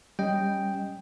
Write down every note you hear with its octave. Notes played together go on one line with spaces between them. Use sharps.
G3 C#4 D#5 G5